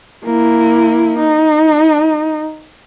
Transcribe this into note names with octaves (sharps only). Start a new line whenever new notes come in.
A#3 E4
D#4